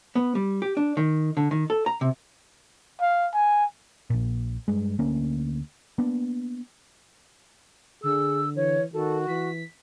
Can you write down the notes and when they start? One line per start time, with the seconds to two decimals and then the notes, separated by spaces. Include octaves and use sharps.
0.15 B3
0.35 G3
0.62 G4
0.77 D4
0.97 D#3
1.37 D3
1.51 D#3
1.70 A4
1.86 A#5
2.01 C3
3.01 F5
3.33 G#5
4.10 A#1 A#2
4.68 G2 G#3
4.99 D2 A#3 C#4
5.98 A#3 B3 D4
8.03 D3 G#4 E6
8.56 E3 C#5
8.94 D#3 F#4 A4
9.28 E3 B6